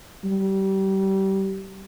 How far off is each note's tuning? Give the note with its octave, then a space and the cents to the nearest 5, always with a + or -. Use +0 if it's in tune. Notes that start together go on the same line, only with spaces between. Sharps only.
G3 -25